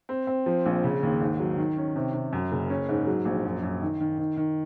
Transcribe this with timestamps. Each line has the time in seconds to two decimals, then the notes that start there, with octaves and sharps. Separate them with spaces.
0.09 C4
0.27 C4
0.46 F3
0.66 A#1
0.84 C#3
1.03 D#2
1.21 G#2
1.40 F#3
1.58 D#3
1.77 C#4
1.96 C3
2.14 C3
2.33 F#2
2.52 F#1
2.70 C#4
2.89 G#2
3.07 F#3
3.25 A#1
3.44 F#2
3.63 F#2
3.82 D#3
4.01 D#3
4.18 D#3
4.37 D#3